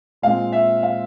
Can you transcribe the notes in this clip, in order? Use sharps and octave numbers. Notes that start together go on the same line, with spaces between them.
A#2 G#3 C4 F5
E5
F5